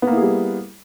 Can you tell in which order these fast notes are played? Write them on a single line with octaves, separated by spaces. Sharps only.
B3 A#3 E4 G#4 G3